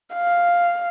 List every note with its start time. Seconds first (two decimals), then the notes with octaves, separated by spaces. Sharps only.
0.14 F5